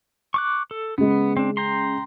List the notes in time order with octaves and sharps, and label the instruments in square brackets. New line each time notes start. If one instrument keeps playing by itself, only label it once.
[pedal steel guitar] C#6 D6 F#6
A4
[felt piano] C#3 G#3 [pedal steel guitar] B3
[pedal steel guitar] C4 D4
G5 A#5 C6